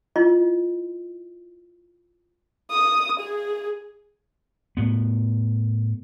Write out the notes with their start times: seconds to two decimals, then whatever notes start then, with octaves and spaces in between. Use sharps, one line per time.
0.16 E4 F4 D#5
2.70 D#6
3.19 G#4
4.77 A2 B3